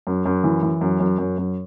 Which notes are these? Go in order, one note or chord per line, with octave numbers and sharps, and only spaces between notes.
F#2
F#2
E3
E3
F#2
F#2
F#2
F#2